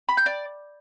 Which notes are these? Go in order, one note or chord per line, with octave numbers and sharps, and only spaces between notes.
B5
G6
D5